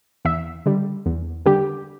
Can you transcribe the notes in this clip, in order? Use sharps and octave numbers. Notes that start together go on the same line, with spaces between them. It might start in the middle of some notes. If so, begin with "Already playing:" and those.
E2 E5
D3 G3
E2
D3 G3 G4